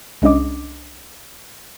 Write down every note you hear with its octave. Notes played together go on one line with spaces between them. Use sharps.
C2 G#3 C#4 D4 D#5 D6